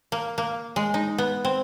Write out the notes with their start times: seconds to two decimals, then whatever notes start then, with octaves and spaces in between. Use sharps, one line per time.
0.12 A#3
0.38 A#3
0.76 G#3
0.94 D#4
1.18 B3
1.45 C4